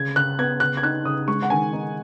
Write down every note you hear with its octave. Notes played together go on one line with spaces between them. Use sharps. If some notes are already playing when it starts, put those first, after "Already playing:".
Already playing: C#3 G#6
C#3 F#6
B3 G#6
C#3 F#6
G#6
D#4 F#6
C#3 D#6
G#3 C#6
F#5
D#3 G#5
D#4